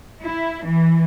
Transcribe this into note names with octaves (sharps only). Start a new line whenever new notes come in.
E4
E3